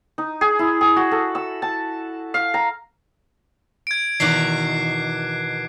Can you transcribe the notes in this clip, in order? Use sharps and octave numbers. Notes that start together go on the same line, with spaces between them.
D#4
G#4
E4
G#4
F#4
A4
E6
A5
F5
A#5
G#6 D7
E2 B2 D#3 D6 F#6 C7